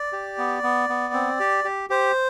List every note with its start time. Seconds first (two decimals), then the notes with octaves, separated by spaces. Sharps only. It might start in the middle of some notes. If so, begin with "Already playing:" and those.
Already playing: D5
0.13 G4
0.38 B3
0.63 B3
0.89 B3
1.13 C4
1.40 G4
1.64 G4
1.90 G4 C5